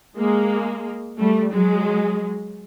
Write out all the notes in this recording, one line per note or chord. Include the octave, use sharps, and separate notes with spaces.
G#3 A#3
G3 A3
F#3 G#3